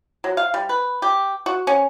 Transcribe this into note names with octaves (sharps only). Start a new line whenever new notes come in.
F#3
F5
G3
B4
G4
F#4
C#4